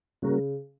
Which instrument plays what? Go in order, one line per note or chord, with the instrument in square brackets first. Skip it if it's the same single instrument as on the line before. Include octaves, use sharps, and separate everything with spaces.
[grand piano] C#3 [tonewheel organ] G3 A#3 C#4 F#4 A#4